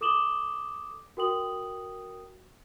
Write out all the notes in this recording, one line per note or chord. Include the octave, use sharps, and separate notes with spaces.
A4 D6 D#6 E7 F#7 G7
F#4 A#4 G5 D#6 F#7